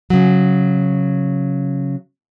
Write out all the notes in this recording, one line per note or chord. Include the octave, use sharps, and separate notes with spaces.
C#3 F#3